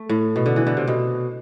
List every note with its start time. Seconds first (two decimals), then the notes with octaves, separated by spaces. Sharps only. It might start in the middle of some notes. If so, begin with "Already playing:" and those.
Already playing: A3
0.09 A2
0.36 B2
0.46 D3
0.56 E3
0.67 D3
0.77 C3
0.88 B2